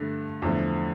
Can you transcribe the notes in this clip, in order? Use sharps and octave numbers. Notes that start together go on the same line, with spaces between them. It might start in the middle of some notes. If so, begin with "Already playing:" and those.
Already playing: G2 D3 A3
E2 D3 F3 A3